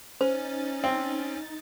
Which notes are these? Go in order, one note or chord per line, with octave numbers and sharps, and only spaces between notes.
C#4 D#4 C5 A6
C4